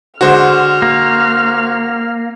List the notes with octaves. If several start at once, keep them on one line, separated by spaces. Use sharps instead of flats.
D3 G#3 F#4 C5 F6
A#3